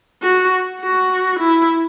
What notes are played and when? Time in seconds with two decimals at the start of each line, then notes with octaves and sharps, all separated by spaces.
0.22 F#4
0.81 F#4
1.39 E4